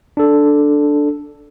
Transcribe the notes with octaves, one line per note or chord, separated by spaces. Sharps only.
D4 A4